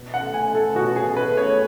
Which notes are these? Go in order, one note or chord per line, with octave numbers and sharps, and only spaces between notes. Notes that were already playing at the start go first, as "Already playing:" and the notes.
Already playing: B2
F#5
A3
G#5
A3
A4
B2 F#4
G#4
B2
B4
A3
C#5